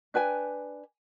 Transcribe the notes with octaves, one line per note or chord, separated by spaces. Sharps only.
D4 B4 G5 G#5